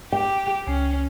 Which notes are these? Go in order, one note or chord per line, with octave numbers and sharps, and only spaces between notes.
G4 G5
C#2 C#4 G#5 C7